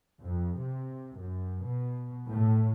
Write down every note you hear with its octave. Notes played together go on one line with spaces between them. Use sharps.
F2
C3
F#2
B2
A2